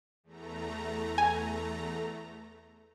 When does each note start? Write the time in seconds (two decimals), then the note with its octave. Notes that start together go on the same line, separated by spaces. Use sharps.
0.24 E2 A3 A#5
1.18 G#5